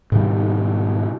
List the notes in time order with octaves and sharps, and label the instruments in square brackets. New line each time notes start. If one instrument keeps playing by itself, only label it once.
[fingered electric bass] G#2 B2 D#3 G3